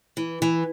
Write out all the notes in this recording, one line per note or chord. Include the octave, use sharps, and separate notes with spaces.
E3
E3